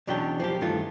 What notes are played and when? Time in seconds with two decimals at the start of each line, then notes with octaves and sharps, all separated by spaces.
0.07 E2 B2 F#3 C#4 D4 G5
0.40 F3 A#3 G4
0.61 G2 D#3 E3 A3 F4